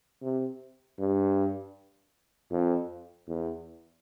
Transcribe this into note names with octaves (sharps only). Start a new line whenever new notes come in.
C3
G2
F2
E2